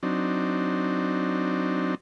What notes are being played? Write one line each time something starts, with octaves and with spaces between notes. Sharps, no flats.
F#3 C4 D4 D#4